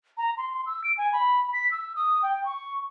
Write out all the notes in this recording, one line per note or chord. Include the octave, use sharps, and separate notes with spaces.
A#5
C6
C6
E6
D7
G#5
B5
B6
E6
D#6
G5
C#6